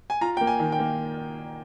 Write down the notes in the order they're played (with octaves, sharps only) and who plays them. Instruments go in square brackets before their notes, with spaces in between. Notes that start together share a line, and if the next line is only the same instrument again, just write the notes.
[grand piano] G#5
[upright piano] F4 [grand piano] A#5
[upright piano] A#3 [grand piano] G5
[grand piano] G#5
[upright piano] D#3
[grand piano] G5
[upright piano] A#3